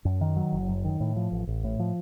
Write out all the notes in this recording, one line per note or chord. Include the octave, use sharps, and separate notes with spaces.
F#2
D#3
F#3
F#1
F#2
D#3
A2
F3
A1
A1
A2
F3